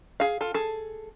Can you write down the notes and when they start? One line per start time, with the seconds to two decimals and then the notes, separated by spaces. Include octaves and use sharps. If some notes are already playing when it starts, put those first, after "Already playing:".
0.20 G#4 F5
0.41 F4 A4
0.54 G#4 A4